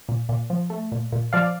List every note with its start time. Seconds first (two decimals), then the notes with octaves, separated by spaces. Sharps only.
0.09 A#2
0.29 A#2
0.50 F3
0.70 A3
0.92 A#2
1.12 A#2
1.33 F3 D5 F5